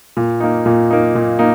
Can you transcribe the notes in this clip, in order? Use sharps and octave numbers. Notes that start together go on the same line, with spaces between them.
A#2
A#3 D#4
A#2
A#3 D#4
A#2
A#3 D#4